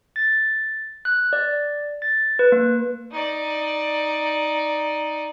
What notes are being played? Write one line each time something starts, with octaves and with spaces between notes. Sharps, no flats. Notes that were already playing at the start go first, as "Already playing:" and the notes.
A6
F#6
D5
A6
B4
A#3
D#4 D5